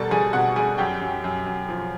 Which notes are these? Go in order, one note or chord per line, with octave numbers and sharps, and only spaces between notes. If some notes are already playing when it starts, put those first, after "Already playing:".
Already playing: B2 G3 A4 A#4 A5
G3 G#4 G#5
B2 F#4 F#5
G3 G#4 G#5
F#2 G4 G5
F#2
F#2
F#2
F3